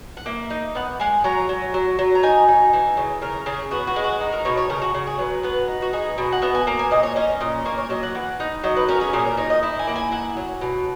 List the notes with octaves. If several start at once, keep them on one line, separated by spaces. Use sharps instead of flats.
F#5
A#3 E5
D#4
B3 F#5
G#3 G#5
F#3 A#5
F#3
F#3
F#3
A#5
D#4 G#5
D#4
E3
C#3
C#3 A#4
C#3 G#4
B3 F#4
F#4
G#3
F#4
D#4
A#4
B2 C#5
C#5
C#3 A#4
F#4
C#3 F#4
G#4
F#3 B4
B3 B4
D#4
F#4
D#4 G#4
B2 G#4
F#5
B3 E5
G#5
A#3 A#5
G#5
A#2 D#5
C#5
C#4 D#5
A#2 D#5
A#3 C#5
C#5
F#3 D#5
F#5
E3 F#5
D#4
F#3 D#5
B4
C#4 A#4
G#4
A#2 G#4
A#4
D#4 C#5
D#5
E4
G#5
A#3 F#5
G#5
E4 F#5
F#3
B2